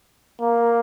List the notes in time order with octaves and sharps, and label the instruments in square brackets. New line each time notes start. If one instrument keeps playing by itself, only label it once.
[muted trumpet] A#3